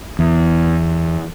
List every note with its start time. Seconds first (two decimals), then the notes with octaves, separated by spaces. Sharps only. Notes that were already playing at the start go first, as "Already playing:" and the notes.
0.19 E2